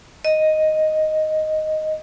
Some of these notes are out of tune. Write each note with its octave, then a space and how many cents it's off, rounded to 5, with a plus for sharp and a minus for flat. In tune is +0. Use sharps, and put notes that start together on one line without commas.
D#5 +0